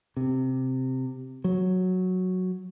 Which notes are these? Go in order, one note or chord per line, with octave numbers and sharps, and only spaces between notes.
C3
F#3